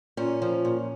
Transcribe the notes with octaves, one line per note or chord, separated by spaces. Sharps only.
A#2 C#4
F3
A#2